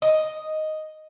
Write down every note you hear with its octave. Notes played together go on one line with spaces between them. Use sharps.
D#5